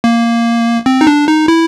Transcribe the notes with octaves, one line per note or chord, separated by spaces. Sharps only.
A#3
C4
D#4
D4
D#4
E4